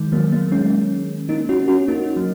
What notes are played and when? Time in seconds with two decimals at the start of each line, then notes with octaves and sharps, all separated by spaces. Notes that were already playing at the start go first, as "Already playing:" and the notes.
Already playing: D#3 G#3
0.12 F#3 A#3
0.32 F#3 A#3
0.52 G#3 C#4
1.29 A#3 D#4
1.49 C#4 F#4
1.68 C#4 F#4
1.88 A#3 D#4
2.16 F#3